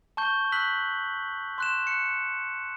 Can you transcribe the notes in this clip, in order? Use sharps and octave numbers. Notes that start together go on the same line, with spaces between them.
A5 C#6 G6 G7
E6 F#6 B6 F#7
C6 F#6 E7
F#6 C#7